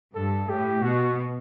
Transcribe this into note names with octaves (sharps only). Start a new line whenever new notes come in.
G2 A4
A2 G4
B2 F#4